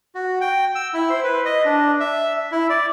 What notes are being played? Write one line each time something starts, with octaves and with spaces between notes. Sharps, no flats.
F#4
G5
E6
E4
C5
B4
D#5
D4
E5
E4
D5